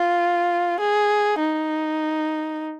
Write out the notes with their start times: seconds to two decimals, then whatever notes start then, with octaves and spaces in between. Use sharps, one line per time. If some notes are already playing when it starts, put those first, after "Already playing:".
Already playing: F4
0.80 G#4
1.39 D#4